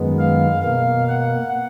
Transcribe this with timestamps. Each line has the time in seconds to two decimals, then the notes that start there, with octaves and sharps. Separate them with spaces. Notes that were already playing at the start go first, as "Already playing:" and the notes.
Already playing: F#2 D#3 G#3 B3
0.19 F5
0.63 B2 A#3 F5
1.09 F#5